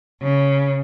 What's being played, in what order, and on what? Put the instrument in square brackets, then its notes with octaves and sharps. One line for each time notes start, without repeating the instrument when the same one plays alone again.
[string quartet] C#3